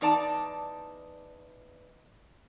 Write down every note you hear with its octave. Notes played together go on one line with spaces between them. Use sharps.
E2 D#4 D5 A5